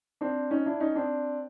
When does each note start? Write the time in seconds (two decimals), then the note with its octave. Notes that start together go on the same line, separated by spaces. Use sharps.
0.21 C4 D4
0.51 C#4 D#4
0.66 D4 E4
0.80 C#4 D#4
0.96 C4 D4